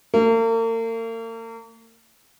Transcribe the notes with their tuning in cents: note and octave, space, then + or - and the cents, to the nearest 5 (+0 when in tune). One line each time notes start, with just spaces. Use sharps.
A#3 -40